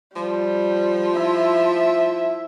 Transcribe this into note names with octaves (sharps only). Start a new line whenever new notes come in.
F3 G3
E4 E5